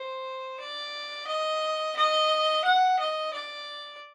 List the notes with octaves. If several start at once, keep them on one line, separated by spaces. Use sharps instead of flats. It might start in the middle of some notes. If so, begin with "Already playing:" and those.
Already playing: C5
D5
D#5
D#5
F#5
D#5
D5